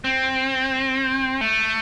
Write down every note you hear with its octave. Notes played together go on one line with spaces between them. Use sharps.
C4
A3